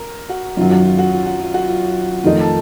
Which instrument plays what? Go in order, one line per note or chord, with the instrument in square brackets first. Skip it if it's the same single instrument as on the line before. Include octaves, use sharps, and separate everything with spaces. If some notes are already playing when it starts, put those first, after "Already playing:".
Already playing: [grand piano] A#4
F#4
[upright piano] F#2 D#3 F#3 [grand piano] F4
[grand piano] F#4
F4
F#4
F4
F#4
F4
F#4
F4
[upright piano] F2 D#3 A3 D#4 [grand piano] F4
[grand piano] A4